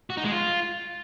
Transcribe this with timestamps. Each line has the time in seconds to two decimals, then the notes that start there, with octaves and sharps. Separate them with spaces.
0.10 F#4
0.17 D#4
0.24 G#3
0.32 F4